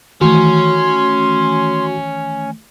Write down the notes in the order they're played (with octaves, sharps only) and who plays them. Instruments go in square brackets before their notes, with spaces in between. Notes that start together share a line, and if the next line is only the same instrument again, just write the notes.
[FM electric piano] D#3 E3 A3 [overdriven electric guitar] C#4 [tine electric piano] F#4 [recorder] C6